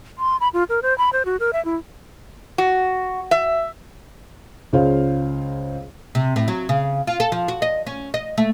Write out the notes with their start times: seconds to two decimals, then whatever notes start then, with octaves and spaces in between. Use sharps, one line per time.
0.19 C6
0.41 B5
0.53 F4
0.69 A#4
0.83 C5
0.98 B5
1.13 C5
1.25 F#4
1.40 A#4
1.53 E5
1.65 E4
2.58 F#4
3.31 E5
4.73 C#2 C#3 F4 C5 C#5 F5
6.15 C3
6.36 A2
6.48 F#3
6.69 C#3
7.07 F4
7.20 A4
7.32 F3
7.48 F#4
7.62 D#5
7.86 C#4
8.14 D#5
8.38 A3